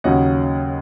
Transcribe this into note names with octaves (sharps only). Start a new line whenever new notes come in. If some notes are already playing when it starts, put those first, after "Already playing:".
D#2 C#3 F#3 C#4 D#5 F#5